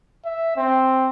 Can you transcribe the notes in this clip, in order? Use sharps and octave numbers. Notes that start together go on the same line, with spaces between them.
E5
C4